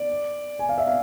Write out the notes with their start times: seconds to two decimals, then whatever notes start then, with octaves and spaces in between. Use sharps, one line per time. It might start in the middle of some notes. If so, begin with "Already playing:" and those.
Already playing: D5
0.59 G#5
0.69 F5
0.78 E5
0.88 F5